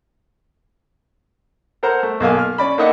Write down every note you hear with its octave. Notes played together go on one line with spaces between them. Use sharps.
A4 A#4 C5 F#5 A#5
A3
B1 A#3 F5 G#5
F6
C#4 D5 B5
A#3 D#4 A4 D#5 E5 F#5